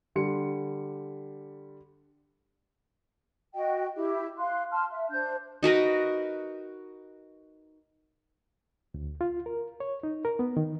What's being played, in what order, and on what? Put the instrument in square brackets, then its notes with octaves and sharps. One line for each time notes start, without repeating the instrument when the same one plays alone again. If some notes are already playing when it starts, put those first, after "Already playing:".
[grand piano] D3 G3 C6 C#7
[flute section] F#4 D#5 G5
E4 G4
F5 C6 F#6
A5 C6 F6
E5
D4 C5 G6
[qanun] D#4 F#4 A#4 B4
[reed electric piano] D2
F4
A#4
C#5
D#4
A#4
B3
D#3